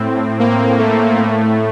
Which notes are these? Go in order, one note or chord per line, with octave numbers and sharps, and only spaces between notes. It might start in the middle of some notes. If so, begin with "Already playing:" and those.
Already playing: A2 C4
A#3
A3
A2